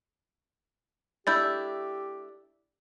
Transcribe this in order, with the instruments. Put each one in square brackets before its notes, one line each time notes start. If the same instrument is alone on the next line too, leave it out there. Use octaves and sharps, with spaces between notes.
[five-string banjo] A3 D4 E4 [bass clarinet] G4 [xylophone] E6 G6 A6